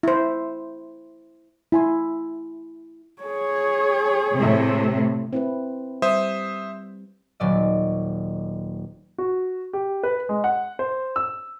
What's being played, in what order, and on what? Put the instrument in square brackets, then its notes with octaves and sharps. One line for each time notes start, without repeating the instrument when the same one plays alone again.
[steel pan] E4 C5
E4 G#5 C6
[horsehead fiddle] G#4 C#5
[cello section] A2 C3
[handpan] C4 E4 B4
[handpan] G3 [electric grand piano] C5 E5 D#6
[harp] D#1 F#3 D5 D#5
[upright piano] F#4
G4
B4
G#3
F#5
C5
E6